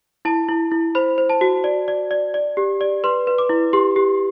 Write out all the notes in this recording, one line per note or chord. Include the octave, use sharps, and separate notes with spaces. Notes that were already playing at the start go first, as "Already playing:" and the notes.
E4 A5
E4
E4
C5 B5
C5
A5
F#4
D5
D5
D5
D5
G4
D5
B4 C6
B4
D6
E4
G4 C6
G4